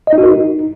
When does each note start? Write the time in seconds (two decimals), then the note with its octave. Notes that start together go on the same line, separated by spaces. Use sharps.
0.07 D#5
0.13 D#4
0.18 F#4
0.23 A#4
0.28 D#4